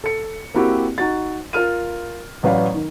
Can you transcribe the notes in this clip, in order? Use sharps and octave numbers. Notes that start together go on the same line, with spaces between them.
A4 C#7
A#3 C4 E4 F#4 G4
D#4 F#4 A6
F4 A#4 F6 D#7
A1 F#3 B4 C#5 D5 F5
D#3